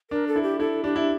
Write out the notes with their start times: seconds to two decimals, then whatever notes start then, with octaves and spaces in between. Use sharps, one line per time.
0.11 D4 A#4
0.28 A4
0.36 E4
0.43 G4
0.60 E4 A4
0.84 D4 G4
0.96 E4